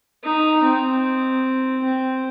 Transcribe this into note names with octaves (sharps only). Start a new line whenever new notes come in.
D#4
C4
C4